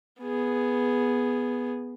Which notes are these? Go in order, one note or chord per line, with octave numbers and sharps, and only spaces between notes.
B3 G#4